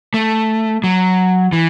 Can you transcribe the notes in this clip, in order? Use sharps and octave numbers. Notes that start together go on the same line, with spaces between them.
A3
F#3
E3